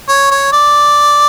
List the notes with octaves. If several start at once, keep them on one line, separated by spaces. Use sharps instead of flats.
C#5
C#5
D5